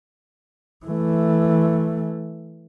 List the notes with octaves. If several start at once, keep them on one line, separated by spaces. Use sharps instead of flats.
E3 A3